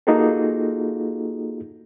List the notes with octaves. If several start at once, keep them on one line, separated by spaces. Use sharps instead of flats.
A#3 D#4 F4 F#4 G#4 A4